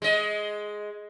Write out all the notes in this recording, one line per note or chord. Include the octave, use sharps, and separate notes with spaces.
G#3 D#5